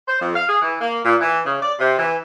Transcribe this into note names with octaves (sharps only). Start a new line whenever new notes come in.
C5
F2
F5
G#4
E3
A#3
A#2
E3
C#3
D5
C3
E3